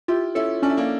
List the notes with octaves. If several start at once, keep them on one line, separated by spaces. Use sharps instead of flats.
E4 F4 G4
C#4 E4 A4
C#4 D4
E4
A#3 D4